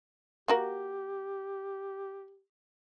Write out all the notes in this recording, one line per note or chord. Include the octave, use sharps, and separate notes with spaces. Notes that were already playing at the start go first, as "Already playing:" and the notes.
A#3 F#4 G4 A#4